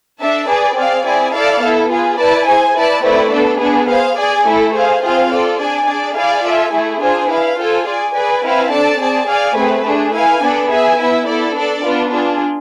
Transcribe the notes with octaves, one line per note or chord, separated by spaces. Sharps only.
D4 A4 E5 A5
G#4 B4 D5
C4 G#4 D5 F5
C4 E4 G#4 D5 G#5
E4 A4 D5 F5 A5
B3 E4 A4
F4 G#4 B4
E4 B4 D5 A5
G#4 C5 G#5
E4 B4 D5 A5
A3 C4 E4 B4 D5
B3 D4 A4
B3 D4 G#4
G#4 C5 F5
G#4 D5 G#5
A3 E4 A4
G#4 C5 F5
C4 F4 G#4 C5 F5
F4 A4 D5
D4 G#4 D5 G#5
D4 G#4 D5
E4 G#4 D5 F5 G#5
F4 A4 E5 G#5
A3 E4 G#4
D4 F4 G#4 C5 G#5
E4 B4 F5
F4 A4 C5 G#5
G#4 D5 G#5
G#4 B4 D5 G#5
C4 E4 B4 F5 G#5
D4 A4 D5 A5
C4 G#4 D5 A5
G#4 D5 F5 G#5
A3 C4 G#4 B4
A3 D4 G#4
E4 B4 F5 G#5
B3 D4 A4 D5
G#4 B4 E5 G#5
B3 E4 B4 E5
B3 E4 A4 D5
D4 A4 D5
B3 D4 F4
D4 F4 G#4